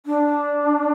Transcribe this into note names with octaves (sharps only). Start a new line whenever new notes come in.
D4